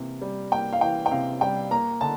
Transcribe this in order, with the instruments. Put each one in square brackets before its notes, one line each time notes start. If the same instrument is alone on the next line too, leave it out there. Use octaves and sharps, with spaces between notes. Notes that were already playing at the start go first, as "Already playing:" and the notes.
Already playing: [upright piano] C3 E3 A#3
G3
A#3 G5
F5
E3 G5
G5
C3 F5
G3 G5
A#3 A#5
D3 A5